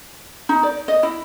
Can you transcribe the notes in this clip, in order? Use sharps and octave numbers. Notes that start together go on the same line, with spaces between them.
D#4
D5
D#5
E4